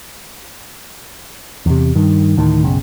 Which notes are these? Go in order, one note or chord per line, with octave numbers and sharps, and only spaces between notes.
E2 C3
G2 D#3
D2 A2 D#3
F#1 B1 C#3